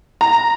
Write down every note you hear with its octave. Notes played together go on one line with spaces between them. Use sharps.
A#5